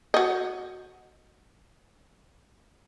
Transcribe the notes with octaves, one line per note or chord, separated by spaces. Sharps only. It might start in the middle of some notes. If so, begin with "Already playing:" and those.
F#4 D#5